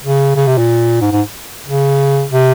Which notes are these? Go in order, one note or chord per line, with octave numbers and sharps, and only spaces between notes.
C#3
C#3
C3
A#2
G#2
G#2
C#3
C3